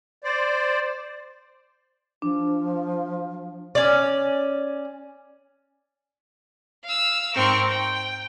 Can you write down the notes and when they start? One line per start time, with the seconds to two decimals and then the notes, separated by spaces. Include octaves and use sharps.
0.24 C5 D5
2.22 F3 D4
3.75 C#4 D5
6.84 F5 E6
7.35 G#2 C4 A#4 C#6
7.70 G5